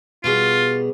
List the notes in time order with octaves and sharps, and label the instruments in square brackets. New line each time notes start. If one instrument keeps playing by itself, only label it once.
[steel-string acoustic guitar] B2 G3 G#4 [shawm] F4